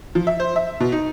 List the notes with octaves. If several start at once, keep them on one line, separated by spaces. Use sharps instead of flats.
F3
E5
C5
E5
B2
D#4